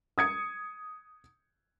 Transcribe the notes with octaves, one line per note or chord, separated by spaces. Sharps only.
D#6 G#6 C#7